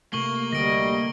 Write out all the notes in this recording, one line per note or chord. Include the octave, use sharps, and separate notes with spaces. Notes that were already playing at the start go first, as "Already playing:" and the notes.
C3 A3 A#3 C#6 F#7 G7
D2 D3 G3 D#5 A#6 D7